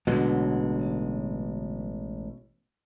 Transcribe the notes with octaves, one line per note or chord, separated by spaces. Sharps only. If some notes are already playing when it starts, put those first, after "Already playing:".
A1 B2 D3 F#3 G#3